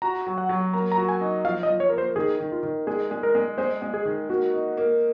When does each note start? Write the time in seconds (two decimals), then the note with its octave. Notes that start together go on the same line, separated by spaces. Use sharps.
0.02 F#4 A#5
0.27 F#3
0.38 F#5
0.49 F#3
0.74 A#3 A#5
0.92 A#5
0.97 F#4
1.09 G#5
1.21 D#4
1.45 F3 F5
1.63 D#5
1.68 F3
1.80 C#5
1.90 A#3 A#4
1.98 C5
2.16 D#3 G#4
2.40 D#3
2.52 F4
2.63 D#3
2.87 G#3 G#4
3.11 G#3
3.23 A#4
3.35 G#3
3.58 G#3 C5
3.82 G#3
3.94 G#4
4.05 D#3
4.29 A#3 F#4
4.53 D#4
4.77 A#3